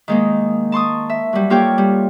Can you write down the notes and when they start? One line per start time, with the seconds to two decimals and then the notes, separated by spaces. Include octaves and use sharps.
0.08 D#3 G#3 A#3
0.72 A5 C6 C#6 D#6
1.09 E5
1.33 F#3 G3
1.50 A#3 F4 G4 A4 C#5 G5
1.78 G3